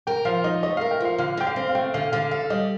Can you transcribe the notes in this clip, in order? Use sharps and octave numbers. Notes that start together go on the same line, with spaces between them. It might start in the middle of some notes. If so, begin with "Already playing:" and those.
A#4 G5
F3 F5
D#4 D#5
A3 D#5
A#4 F5
G5
F3 F5
D3 F5
D3 G5
F5
C4
F5
A3 G5
D3 F5
D3 F5
A4 F5
G3 D#5